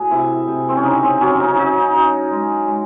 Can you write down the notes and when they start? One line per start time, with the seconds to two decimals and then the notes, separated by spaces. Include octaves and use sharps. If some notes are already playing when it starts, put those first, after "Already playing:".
Already playing: A2 F#4 G#4
0.10 C3 E4
0.48 C3
0.69 C4
0.77 C#4
0.84 C#3 D#4
1.03 C4
1.20 F#3 C#4
1.40 D#4
1.57 F#3 D#4
1.94 F#3
2.31 G#3
2.67 G#3